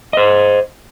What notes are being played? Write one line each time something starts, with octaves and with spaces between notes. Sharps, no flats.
C5 D#5